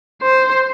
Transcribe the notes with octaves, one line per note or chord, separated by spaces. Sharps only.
C5